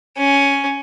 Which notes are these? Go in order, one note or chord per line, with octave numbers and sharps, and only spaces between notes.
C#4